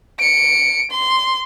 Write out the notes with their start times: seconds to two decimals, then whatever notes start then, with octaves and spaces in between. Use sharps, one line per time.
0.19 C#7 D7
0.91 C6